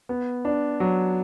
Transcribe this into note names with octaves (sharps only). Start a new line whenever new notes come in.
B3
D4
F#3